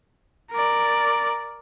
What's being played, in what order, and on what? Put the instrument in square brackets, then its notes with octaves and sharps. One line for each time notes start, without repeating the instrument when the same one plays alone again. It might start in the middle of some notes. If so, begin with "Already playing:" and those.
[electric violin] A#4 D5